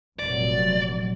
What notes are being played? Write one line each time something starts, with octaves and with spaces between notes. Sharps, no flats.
F1 A#2 F#3 D5